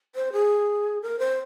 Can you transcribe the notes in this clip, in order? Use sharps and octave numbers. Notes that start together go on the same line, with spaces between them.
C5
G#4
A#4
C5